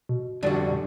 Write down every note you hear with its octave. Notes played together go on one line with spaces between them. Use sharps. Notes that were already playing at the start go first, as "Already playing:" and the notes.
B2
F2 D3 G3 D4 F#4